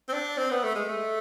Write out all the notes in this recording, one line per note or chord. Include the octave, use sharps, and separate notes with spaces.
C4
D4
C4
B3
A3
G#3
A3